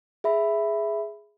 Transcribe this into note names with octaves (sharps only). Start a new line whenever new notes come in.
G#4 E5 B5